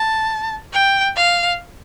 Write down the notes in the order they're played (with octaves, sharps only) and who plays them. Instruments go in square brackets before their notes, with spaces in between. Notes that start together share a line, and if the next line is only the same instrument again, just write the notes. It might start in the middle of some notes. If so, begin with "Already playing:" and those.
Already playing: [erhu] A5
G5
F5